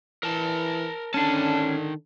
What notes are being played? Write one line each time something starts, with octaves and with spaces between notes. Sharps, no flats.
E3 A#4 A5
D3 D#3 C#4 D4 A5